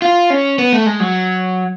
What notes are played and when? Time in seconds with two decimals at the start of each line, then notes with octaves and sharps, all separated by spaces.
0.02 F4
0.30 C#4
0.58 B3
0.73 A3
0.86 G#3
1.00 F#3